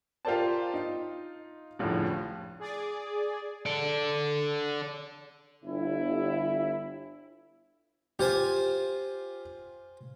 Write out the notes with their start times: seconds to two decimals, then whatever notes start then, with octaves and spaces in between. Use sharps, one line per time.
0.25 F4 G4 A#4 C5 D5 A5
0.74 D#4 F4
1.79 F1 C#2 A2 D3 F3
2.59 G#4 D5
3.66 A4 D5
5.65 G1 E4
8.19 F4 G4 C5 G#5